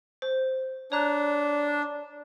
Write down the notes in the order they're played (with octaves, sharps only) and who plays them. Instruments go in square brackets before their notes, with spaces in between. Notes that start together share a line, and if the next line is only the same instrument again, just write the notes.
[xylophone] C5
[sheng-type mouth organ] D4 [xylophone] C#5 A#5 F#6